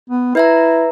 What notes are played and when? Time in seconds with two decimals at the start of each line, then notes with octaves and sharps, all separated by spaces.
0.10 B3
0.35 E4 B4 E5 A#5